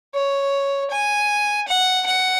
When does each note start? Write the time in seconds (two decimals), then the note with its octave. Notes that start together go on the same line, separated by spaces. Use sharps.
0.14 C#5
0.90 G#5
1.68 F#5
2.06 F#5